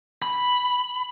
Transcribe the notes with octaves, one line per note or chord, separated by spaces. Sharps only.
B5